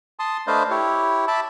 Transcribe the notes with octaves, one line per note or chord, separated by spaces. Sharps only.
A5 C6 D#6
A3 D4 B4 C5 D#5 F5
E4 G4 C#5
E5 A5 B5 D6